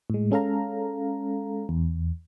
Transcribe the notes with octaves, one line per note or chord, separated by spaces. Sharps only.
A2 G#3
G#3 C#4 A4 F5 A#5
E2